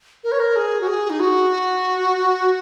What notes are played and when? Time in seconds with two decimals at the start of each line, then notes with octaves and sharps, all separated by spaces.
0.24 A#4
0.32 C#5
0.39 A#4
0.56 G#4
0.81 F#4
0.88 G#4
1.10 D#4
1.20 F#4